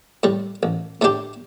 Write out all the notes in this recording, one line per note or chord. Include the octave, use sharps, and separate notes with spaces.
A2 G3
A1
A2 A3 D4 G4